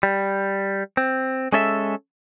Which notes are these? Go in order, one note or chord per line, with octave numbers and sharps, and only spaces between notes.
G3
C4
G#3 C#4 A4 E5